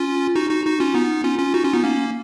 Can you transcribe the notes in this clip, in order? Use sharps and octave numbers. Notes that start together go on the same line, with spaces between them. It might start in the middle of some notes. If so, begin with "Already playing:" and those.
Already playing: C#4 F4
D#4 F#4
D#4 F#4
D#4 F#4
C#4 F4
B3 D#4
C#4 F4
C#4 F4
D#4 F#4
C#4 F4
B3 D#4
A#3 C#4